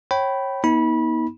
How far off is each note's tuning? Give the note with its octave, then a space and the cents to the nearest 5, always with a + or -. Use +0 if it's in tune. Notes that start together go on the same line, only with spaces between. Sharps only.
C#5 -30 G5 -20 B5 +0
B3 -30 D#4 +40 B5 -25